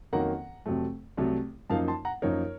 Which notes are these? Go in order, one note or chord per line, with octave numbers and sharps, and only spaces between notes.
F2 D#3 F#3 A#3 C#4 F#5 A#5
F2 C3 F#3 A3
C2 C3 F#3 A3
F#2 F3 A#3 D#4 F5 A5
A5 C6
F#5 A#5
F#2 F3 A#3 D#4 A#4 C#5